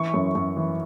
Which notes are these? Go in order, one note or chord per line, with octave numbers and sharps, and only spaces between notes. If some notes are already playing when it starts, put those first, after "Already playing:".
Already playing: E3 C#6
F#2
F#2
E3